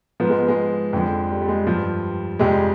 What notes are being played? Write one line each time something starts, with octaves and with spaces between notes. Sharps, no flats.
G#2 F3 B3
G#3
B3
G#3
F2 D3 F3
G3
G3
G#3
G2 F3 G3
F2 C3 G3 G#3